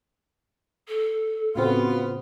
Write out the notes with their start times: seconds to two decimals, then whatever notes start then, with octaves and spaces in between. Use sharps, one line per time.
0.88 A4
1.55 A2 C#3 B3 C4 F4 F#4